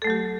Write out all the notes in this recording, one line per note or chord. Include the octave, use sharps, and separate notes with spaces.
F#3 A3 G4 A4